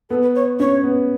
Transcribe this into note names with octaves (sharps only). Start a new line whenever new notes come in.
B3 A4
B4
C#5
C#4 C#5
B3